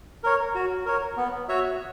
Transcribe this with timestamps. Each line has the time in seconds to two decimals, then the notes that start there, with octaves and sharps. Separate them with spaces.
0.24 A#4 C#5
0.55 F#4
0.86 A#4 C#5
1.17 B3
1.49 F#4 C#5 E5